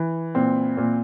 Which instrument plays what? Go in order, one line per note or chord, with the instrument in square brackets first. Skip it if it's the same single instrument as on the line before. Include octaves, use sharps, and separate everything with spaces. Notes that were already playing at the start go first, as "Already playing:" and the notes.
Already playing: [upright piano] E3
A#2 C4
A#2